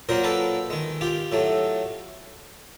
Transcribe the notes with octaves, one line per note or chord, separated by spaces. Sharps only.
A#2 F#3 A#3 A#4 C5
A4 B4
D#3 G#3
F4 G4
A2 F#3 A3